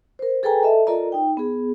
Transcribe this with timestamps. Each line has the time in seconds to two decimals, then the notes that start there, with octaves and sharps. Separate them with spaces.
0.19 A#4 C5
0.43 G#4 A4 B4 G5 G#5 A#5
0.63 A4 D#5 E5 A5
0.87 F4 A4 A#4 D5 D#5 A#5
1.12 D#4 G5
1.37 B3 G#4